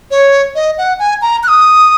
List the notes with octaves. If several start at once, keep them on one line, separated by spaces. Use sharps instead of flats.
C#5
D#5
F#5
G#5
A#5
F#6
D#6